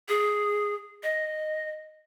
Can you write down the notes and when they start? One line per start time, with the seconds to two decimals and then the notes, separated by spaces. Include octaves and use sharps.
0.09 G#4
1.03 D#5